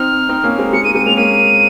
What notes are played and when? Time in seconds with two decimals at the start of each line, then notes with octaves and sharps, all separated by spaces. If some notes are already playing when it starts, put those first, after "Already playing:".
Already playing: C4 D#4 F6
0.29 C4 D#4
0.44 A#3 C#4
0.59 G#3 C4
0.73 G#3 C#7
0.84 A#3 D#7
0.95 G#3 C4 D#7
1.06 A#3 C#4 F7
1.17 A#3 C#4 D#7